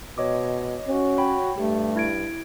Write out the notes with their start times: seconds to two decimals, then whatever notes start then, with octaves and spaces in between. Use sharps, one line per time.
0.18 B2 C#5 D#5 D6
0.88 C#4 F#4
1.18 C#5 G5 B5
1.57 G2 A3 G4
1.96 E4 G#6 D7